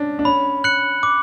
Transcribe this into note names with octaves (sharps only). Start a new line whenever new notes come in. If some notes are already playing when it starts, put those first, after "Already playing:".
Already playing: C#4 D4
D4
C#4 B5
F#6 C#7 F#7
D6